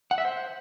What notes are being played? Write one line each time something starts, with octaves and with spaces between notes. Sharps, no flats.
F#5
E5
C5